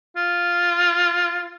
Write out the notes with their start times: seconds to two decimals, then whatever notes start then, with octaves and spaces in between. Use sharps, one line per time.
0.16 F4